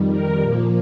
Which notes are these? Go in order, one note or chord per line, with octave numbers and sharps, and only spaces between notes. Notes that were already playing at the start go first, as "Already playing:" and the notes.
Already playing: F2 D#3 G3
A#4
A#2 F3 A#3